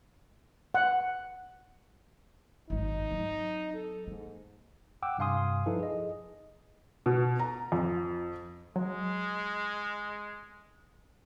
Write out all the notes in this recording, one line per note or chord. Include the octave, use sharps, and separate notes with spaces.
F#5
G#1 F#2 D#4
F#3 C4
A4
G#2 A#3
F#5 G5 D6 E6 F#6
G2 C3 F5 G#5 C6 D#6
F3 D#4 E4 A4 B4
G#4 D#5
B2
A#5
F2
F#3 G#3